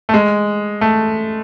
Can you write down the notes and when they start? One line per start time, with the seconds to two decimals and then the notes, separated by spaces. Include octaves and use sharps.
0.09 A3
0.14 G#3
0.81 A3